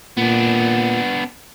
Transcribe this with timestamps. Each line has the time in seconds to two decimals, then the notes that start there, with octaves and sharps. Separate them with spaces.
0.17 A#2 B3 D4